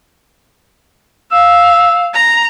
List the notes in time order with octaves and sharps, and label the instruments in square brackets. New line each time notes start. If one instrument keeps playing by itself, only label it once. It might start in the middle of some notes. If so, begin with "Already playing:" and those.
[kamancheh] F5 [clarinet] E6
[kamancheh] A#5